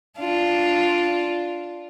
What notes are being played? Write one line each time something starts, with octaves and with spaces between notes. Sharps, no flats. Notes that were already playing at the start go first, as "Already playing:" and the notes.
D4 F4